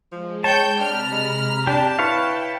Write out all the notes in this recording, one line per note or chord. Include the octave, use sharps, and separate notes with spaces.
F3 G#3
C#5 G5 A5 G6
C3 D4 A#5 B5 F6
G#3
D4 G4 A5
E4 B4 C#5 F5 G5